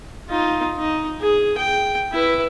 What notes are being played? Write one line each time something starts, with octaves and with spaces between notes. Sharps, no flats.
D#4 F4
D#4
G#4
G5
E4 B4